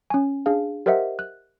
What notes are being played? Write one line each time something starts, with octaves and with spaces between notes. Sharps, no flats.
C#4 G#5
D4 G#4 F5
G4 A#4 C5 D#5 E5 F#5
F#6